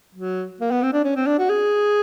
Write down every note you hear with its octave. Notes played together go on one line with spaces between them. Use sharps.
F#3
A#3
B3
C4
D4
C#4
C4
D4
F#4
G#4